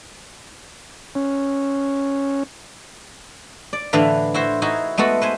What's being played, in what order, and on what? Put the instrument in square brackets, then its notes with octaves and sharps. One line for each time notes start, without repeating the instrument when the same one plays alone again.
[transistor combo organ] C#4
[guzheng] D5
A2 D3 E3 D4 B4 F5
E4 F#4 C5
D#4 E4 F#4 G#4
G#3 A3 B3 F#4 A4
B4 C5 G#5